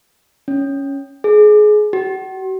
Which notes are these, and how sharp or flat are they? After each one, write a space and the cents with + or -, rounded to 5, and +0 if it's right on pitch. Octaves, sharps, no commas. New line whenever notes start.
C#4 +0
G#4 +25
F#4 +40